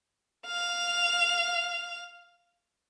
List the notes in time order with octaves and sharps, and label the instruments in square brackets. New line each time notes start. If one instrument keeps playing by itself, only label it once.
[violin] F5 F7